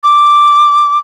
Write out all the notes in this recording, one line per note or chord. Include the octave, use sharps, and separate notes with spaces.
D6